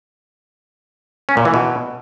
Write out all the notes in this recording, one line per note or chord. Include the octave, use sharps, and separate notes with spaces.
C#4
A#2
E3
B2